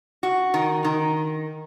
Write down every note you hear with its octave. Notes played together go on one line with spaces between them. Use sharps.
F#4
D#3
D#3